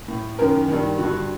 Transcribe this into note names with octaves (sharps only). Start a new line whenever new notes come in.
A2
F#2 D#3 A#4
G2 D#3
G2 D3 F#4